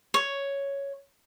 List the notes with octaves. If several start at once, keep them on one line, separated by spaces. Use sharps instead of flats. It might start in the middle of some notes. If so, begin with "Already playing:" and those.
C#5